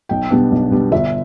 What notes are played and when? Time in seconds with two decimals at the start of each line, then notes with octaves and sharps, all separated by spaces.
0.09 B1 G5
0.31 B2 G3 B3 D4
0.52 B1
0.71 B2 G3 B3 D4
0.92 G1 E5